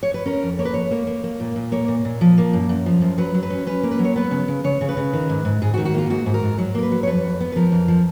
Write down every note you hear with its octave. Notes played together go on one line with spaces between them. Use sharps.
C#5
B4
C#4 A#4
F2
A#3 C#5
B4
F2 C#5
A#3
A#3
A#3
A#2
A#2
A#3 C#5
A#2
A#2
F3
A#3
F#2
F#2
F3
F#2
F#3 B4
F#3
B4
C#4
C#4 B4
A#3
B4
F#3
C#5
B3 B4
C#3
C#3
C#3 C#5
C#3
B4
C#3
D#3
G#2
G#2
G#2 G#4
F#4
D#3
F#4
A#3 F4
G#2 F#4
G#2
A#4
G#2
F#3
A#3 A#4
B4
F#3
C#5
F2 B4
F2
B3
B4
F3 A#4
F2
F3